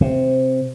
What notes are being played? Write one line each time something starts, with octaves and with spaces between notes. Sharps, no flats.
C3